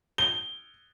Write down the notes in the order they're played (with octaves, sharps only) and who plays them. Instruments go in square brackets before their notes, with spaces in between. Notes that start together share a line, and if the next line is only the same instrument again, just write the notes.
[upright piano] G7